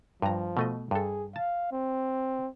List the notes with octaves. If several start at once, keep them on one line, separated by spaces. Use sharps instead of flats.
G2 F3 A#5
B2 A3 D#5
G2 G#4 A4
F5 A5
C4